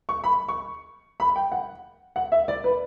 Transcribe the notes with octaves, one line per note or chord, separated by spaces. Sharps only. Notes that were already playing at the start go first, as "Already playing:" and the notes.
C#6
B5
C#6
B5
G5
F#5
F#5
E5
D5
B4